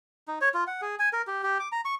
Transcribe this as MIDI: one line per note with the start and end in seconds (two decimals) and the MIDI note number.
0.28 0.39 63
0.41 0.49 73
0.54 0.64 65
0.67 0.81 78
0.82 0.95 68
0.99 1.09 80
1.13 1.22 70
1.27 1.42 67
1.43 1.58 67
1.60 1.68 86
1.72 1.81 82
1.85 1.95 85